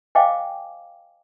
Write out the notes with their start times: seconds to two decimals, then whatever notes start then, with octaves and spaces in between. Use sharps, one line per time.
0.15 C5 D#5 F5 G5 G#5 D6